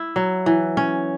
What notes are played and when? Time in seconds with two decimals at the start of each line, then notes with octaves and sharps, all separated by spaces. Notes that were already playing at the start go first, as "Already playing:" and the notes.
Already playing: E4
0.16 F#3
0.46 E3
0.77 C#4